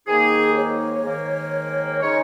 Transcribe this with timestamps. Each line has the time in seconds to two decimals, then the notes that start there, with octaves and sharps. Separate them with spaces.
0.08 G#2 D#3 A#3 D#4 G#4
0.56 C#5
1.04 G#2 D#3 A#3
2.01 C#3 G#3 D#4 C#5